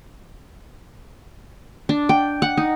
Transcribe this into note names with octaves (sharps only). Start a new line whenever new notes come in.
D4
G5
F#5
D#4